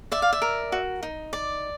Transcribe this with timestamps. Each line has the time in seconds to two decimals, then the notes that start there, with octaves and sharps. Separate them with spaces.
0.12 D5 E5
0.22 F5
0.33 E5
0.42 A#4
0.72 F#4
1.03 D#4
1.33 D5